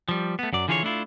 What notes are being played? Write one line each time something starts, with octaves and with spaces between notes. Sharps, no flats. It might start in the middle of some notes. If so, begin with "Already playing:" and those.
F3 G3
A3 B3
F#2 F#3 D5
D3 E3 F4 G#4 A4 C#5
A3 D4 E4 F4